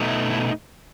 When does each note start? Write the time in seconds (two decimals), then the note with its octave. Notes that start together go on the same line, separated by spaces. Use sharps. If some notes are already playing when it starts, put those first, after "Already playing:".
Already playing: B2 A3 D#4
0.08 E4
0.30 E4